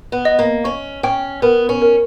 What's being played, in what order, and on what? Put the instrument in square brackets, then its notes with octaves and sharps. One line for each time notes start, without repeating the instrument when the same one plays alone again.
[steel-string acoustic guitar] B3
[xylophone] D#5
[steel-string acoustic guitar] A#3
[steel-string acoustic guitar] C#4 [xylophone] C#6
[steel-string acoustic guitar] C#4 [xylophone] G5
[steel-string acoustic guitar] B3 [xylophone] A#4
[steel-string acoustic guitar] C#4
[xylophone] A#4